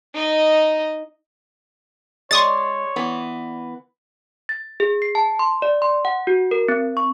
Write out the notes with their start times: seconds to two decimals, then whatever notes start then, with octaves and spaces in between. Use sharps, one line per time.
0.14 D#4 D#5
2.31 G#3 C#5 D5 C6 C#6 D#6 A6
2.96 E3 B3
4.49 A6
4.80 G#4
5.02 C7
5.15 A5
5.39 C6
5.62 D5
5.82 C6
6.05 F#5
6.27 F#4
6.51 A#4
6.68 C4
6.97 C#6